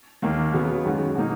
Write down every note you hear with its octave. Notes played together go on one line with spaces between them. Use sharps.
D#2 D#3 A#3
C#3 F#3 B3
F#2 D#3 G#3 C#4 F#4
B2 A#3 D#4